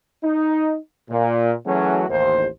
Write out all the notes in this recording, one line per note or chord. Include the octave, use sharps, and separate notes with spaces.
D#4
A#2
E3 F#3 A3 C#4 F#4 G#4
A1 D#2 C5